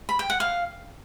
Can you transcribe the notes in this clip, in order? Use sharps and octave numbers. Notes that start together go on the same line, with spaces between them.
B5
G5
F#5
F5